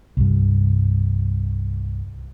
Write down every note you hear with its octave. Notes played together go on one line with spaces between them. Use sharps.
C2 G2